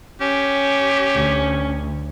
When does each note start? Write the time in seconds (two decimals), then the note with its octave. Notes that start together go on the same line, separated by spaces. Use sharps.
0.21 C#4 G4
1.15 D2